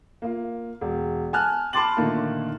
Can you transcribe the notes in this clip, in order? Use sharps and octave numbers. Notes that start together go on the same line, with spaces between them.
A#3 F4
E1
G#5 A5 F6 F#6
A5 B5 C6 D6 A6 F#7
A#2 D3 D#3 A3 A#3